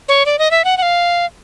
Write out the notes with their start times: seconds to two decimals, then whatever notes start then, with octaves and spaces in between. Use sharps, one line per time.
0.09 C#5
0.26 D5
0.39 D#5
0.51 E5
0.65 F#5
0.77 F#5
0.82 F5